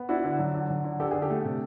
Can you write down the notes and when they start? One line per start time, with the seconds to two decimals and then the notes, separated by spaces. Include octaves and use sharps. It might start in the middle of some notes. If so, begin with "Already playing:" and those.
Already playing: B3
0.09 D4 E4 F#4
0.24 D3
0.39 F#3
0.55 D3
0.69 F#3
0.84 D3
1.00 D3 G4 A4
1.11 D4 G#4
1.22 G4 A4
1.30 A3
1.45 C3